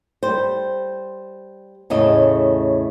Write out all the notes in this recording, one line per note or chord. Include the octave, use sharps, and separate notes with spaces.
G3 C5
E2 A2 C#3 D#5